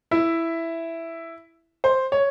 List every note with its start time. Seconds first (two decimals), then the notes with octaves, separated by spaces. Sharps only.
0.11 E4 E5
1.84 C5
2.12 C#5